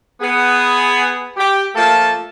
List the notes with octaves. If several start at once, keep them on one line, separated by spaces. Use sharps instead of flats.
B3 G#4
G4
F3 A3 A#3 A4 A5